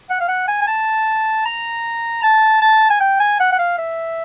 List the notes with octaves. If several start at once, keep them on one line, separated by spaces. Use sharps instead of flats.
F#5
F5
F#5
G#5
G#5
A5
A#5
A5
A5
G#5
G5
G#5
F#5
F#5
F5
E5